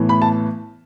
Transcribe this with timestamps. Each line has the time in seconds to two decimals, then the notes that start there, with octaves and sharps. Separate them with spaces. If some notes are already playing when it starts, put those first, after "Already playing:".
Already playing: A2 E3 B3
0.09 B5
0.22 A5